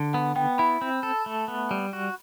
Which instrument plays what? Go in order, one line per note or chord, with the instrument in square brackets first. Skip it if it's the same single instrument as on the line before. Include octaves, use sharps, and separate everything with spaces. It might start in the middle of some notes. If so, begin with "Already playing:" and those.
Already playing: [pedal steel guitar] D3
[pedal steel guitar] B3 [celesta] F#5
[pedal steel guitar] B3 [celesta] G5
[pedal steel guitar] E4 [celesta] B5
[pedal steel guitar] C4
A4
A3
B3
G3
F#4